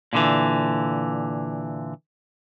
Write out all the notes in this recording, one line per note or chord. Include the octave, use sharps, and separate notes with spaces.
A#2 D3 E3